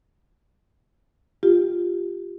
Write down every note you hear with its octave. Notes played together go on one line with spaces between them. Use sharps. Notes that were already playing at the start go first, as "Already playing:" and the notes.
F4 G4